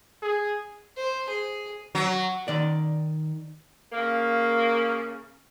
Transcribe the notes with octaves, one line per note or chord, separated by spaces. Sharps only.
G#4
C5
G#4
F#3
D#3 D5
C#3 A#3